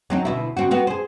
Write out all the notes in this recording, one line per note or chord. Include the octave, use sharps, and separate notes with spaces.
F#3 C4 D#4
D2 B2 E4
D2 C4 F#4
B3 C4 F#4
G#4 C5